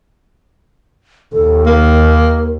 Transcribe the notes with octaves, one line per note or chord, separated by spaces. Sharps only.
D#2 A4
A#3 A#4